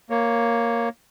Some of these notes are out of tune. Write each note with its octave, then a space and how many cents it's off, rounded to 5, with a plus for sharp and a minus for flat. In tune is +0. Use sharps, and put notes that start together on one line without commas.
A#3 +0 C#5 +0